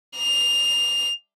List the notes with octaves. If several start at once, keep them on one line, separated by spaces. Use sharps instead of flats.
F7